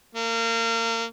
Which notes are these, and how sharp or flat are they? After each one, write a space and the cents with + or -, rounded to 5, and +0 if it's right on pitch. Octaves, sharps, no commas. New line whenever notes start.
A#3 -30